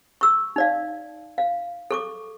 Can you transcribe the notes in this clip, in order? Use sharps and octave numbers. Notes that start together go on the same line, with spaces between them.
C#6 E6
D#4 D5 F5
F5
A4 C#6 D6